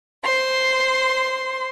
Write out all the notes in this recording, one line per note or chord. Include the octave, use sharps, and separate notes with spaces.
C5 C6